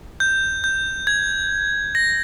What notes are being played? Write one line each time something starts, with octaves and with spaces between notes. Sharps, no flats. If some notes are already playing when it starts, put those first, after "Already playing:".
G6
G6
G#6
A#6